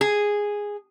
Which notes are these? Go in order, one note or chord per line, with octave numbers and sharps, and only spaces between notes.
G#4